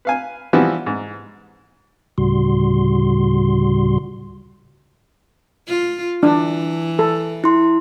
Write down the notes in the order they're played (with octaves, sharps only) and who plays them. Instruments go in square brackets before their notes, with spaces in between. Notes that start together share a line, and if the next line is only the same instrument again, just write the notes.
[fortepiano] B4 F5 G#5
E3 F3 G3 B3 E4 F#4
G#2
[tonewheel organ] D2 A2 C#3 G3 F#4 C6
[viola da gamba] F4
[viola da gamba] E3 [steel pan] D4
[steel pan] A4
[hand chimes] E4 C6